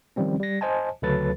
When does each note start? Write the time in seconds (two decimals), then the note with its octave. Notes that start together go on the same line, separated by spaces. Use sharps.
0.16 D#3 F3 G3 C4 C#4
0.40 G3 A#6
0.61 C5 D#5 G#5 A5
1.02 D2 C#3 F#3 A4 B4 A6